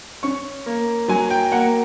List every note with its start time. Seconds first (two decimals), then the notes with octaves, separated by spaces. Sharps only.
0.23 C#4 C#6
0.66 A#3
1.08 F#3 G#5
1.30 G5
1.52 A#3 F#5